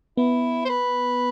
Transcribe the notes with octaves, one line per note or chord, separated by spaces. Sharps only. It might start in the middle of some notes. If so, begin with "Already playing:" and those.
B3 E4
C5
B4